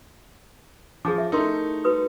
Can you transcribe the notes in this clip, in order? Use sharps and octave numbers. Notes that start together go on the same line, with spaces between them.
F3 G#4 G#5 D6
E5
A3 D#4 E4 A#4 C6
F#4 B4 D#6